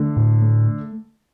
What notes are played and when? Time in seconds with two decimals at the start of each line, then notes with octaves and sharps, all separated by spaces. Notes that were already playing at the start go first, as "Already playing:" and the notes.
Already playing: D3 A3
0.16 A2
0.42 A3